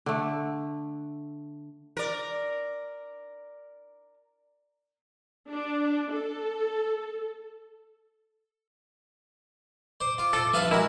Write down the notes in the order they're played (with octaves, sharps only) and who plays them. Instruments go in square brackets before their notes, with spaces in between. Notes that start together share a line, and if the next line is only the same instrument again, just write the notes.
[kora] D3 A3
[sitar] A#4 D5
[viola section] D4
A4
[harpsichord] C5 [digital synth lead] D6
[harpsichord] F4
[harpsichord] F4 C5 [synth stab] A4
[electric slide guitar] F3 G3 E5 [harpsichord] B4 F5 A5
[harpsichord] G#3 F#4 [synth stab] E4 [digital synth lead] A#4